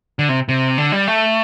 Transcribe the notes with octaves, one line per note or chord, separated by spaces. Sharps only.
D3
C3
C3
D3
G3
A3